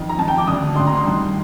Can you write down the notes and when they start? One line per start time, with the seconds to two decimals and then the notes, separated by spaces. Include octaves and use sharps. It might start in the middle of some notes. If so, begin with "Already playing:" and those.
Already playing: F2 D#3
0.09 A#5
0.19 F2 D#3 A5
0.28 G5
0.38 D6
0.47 D2 D3 D#6
0.75 D2 D3 C6
0.87 A#5
0.97 C6
1.04 G2 D#3